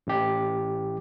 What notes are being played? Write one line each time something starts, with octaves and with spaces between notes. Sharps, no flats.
A1 G4